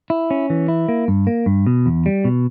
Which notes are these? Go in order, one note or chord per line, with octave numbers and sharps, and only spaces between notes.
E4
C#4
E3
E4
A#3
G2
A#3
G2
B2
E2
G3
B2